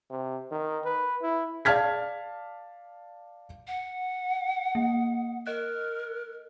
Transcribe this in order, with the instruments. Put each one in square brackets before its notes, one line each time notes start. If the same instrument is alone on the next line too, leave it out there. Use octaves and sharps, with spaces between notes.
[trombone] C3
D#3
B4
E4
[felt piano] D5 F5 A5 F6 G#6 B6
[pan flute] F#5
[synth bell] A#3
[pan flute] A#4 [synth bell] D#5 F#6